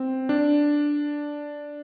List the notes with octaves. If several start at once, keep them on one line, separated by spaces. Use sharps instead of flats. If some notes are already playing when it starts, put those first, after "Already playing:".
Already playing: C4
D4